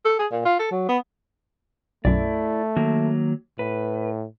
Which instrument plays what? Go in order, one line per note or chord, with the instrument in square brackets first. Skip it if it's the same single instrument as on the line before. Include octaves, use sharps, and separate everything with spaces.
[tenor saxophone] A4
G#4
A#2
F4
A4
F#3
B3
[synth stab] B1 F#2 [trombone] A3 [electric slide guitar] E4 D5
[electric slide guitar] D#3 F#3 A#3
[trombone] A2 [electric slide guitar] B4